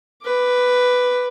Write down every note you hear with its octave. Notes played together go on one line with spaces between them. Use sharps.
B4 D6